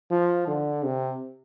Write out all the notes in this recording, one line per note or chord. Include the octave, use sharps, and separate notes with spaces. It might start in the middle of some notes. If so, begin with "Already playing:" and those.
F3
D3
C3